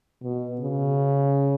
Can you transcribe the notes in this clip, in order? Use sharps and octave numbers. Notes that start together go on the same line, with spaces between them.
B2
C#3